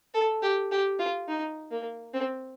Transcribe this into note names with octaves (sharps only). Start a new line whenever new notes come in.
A4
G4
G4
F4
D#4
A#3
C4